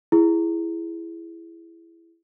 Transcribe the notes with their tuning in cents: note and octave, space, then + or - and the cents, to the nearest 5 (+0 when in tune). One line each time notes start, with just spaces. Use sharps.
E4 +15 G#4 +0